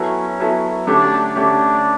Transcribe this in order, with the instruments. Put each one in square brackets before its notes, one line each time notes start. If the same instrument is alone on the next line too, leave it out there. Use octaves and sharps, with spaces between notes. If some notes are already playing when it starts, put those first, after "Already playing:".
Already playing: [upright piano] F#3 B3 E4 A4 [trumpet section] C#4
[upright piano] F#3 B3 E4 A4
[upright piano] D3 A3 C#4 G4 [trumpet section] D4
[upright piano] D3 A3 C#4 G4 [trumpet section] D4